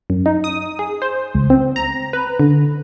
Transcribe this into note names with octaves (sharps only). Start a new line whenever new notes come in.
F#2
D#4
D#6
G#4
C5
C#2
C4
A#5
B4
D3